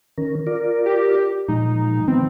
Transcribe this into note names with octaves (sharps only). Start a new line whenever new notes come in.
D#3 C#4 A#4
F4 A#4 D5
G4
A#2 F3 G#3 D#4
D#3 F3 B3 C4